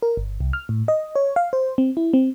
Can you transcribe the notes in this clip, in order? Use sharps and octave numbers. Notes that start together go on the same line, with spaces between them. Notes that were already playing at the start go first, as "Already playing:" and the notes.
A#4
G1
C2
F6
A2
D#5
C#5
F5
C5
C4
E4
C4